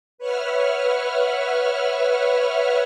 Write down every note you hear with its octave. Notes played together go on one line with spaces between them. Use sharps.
B4 C#5 E5 F#5 F6